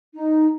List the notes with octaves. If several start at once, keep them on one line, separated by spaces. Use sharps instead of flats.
D#4